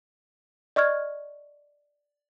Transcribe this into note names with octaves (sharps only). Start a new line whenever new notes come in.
D5 D#5 C#6 F6 G#6